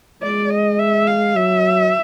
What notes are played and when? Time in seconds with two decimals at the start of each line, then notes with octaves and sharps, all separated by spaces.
0.22 G#3 D5
0.51 D#5
0.79 E5
1.07 F5
1.35 F#3 E5